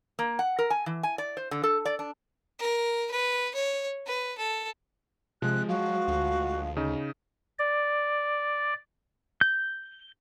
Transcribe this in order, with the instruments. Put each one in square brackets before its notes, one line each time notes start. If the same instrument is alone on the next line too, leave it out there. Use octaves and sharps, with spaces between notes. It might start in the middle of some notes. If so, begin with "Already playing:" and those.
[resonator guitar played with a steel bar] A#3
F#5
A#4
G#5
E3
G#5
D5
C5
D3
A4
D5
D4
[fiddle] A#4
B4
C#5
B4
A4
[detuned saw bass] C3 [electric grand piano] F3 G#3 [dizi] F#6
[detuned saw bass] F#3 [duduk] F#4 [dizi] F5
[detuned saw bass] D2
[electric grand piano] C#3 D#4
[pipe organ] D5
[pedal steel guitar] G6